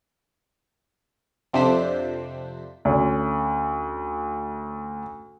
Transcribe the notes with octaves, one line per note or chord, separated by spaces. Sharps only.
F2 C3 D4 C5 B6
D2 C#4